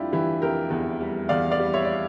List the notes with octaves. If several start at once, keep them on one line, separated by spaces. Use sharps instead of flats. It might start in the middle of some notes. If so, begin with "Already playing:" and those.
Already playing: F1 G3 D4 E4 F4 G4
E3 E4 G4
F1 G4 A#4
E2
G3
E2 D5 F5
D5 F5
G3
C#5 E5
D5